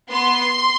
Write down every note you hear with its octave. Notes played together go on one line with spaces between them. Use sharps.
B3 C6